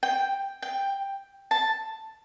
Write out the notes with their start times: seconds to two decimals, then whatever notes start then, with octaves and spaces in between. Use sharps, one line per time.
0.03 G5
0.62 G5
1.51 A5